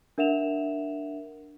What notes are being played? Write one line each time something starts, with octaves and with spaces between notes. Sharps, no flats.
D4 A#4 E5 F#5 E7 F7